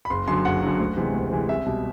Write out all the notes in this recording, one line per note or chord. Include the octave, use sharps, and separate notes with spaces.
B5
F#1 C6
F#2 D3 F#3 C6
F#1 F#5
F#2 D3 F#3
D2
C3 E3 G#3
D2
C3 E3 G#3
C2 E5
B2 G3